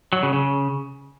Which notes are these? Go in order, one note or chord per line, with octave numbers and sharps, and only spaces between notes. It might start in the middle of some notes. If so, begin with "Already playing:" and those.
F#3
C#3
C#3